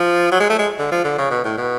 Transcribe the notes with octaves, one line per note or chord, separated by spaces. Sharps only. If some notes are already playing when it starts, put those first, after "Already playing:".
Already playing: F3
F#3
G#3
A3
G#3
D3
F3
D3
C#3
B2
A2
B2